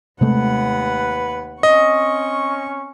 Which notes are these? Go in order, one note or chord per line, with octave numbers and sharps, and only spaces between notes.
D#2 C3 G#3 A3 B4 F#5
C4 C#4 D#5 C#6